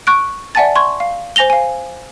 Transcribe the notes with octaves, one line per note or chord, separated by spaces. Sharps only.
C#6 F#6 D7
D5 E5 F#5 G#5 A5 A6
C6 C#6 G#6
F5
C5 G#5 A#6 F7 G7
F5 G#5